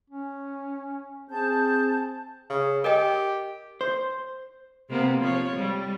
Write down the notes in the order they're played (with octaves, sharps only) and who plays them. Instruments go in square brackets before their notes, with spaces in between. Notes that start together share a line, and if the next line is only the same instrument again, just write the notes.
[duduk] C#4
[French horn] C4 [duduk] G#4 [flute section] A5 G6
[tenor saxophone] C#3
[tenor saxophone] G4 [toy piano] A#4 D#5 G5
[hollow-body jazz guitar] C5
[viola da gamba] C3 A#3 B3
F3 C#5
G3